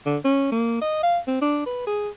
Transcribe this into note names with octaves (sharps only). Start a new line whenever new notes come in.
D3
C#4
A#3
D#5
F5
C4
D4
B4
G#4